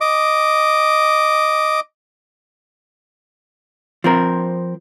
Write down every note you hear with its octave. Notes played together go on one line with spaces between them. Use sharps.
D#5 D6
F3 C4 A#4